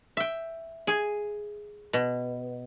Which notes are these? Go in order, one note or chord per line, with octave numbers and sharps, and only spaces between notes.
E5 G5
G#4 G#5
B2